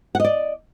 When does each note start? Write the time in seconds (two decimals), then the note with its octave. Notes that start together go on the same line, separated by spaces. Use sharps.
0.15 F#5
0.20 D#5
0.24 D5